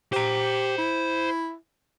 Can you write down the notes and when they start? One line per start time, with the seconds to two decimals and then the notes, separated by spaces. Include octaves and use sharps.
0.13 G4 C5 A#5
0.78 E4